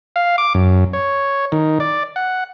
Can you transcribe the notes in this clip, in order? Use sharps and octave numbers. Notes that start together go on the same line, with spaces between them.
F5
D6
F#2
C#5
D#3
D5
F#5